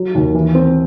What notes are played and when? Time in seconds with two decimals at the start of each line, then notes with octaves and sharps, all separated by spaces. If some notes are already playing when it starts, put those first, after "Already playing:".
Already playing: F#3
0.15 D#2
0.34 E3
0.55 C4